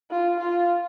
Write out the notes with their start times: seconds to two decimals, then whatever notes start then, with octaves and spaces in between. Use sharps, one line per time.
0.11 F4
0.39 F4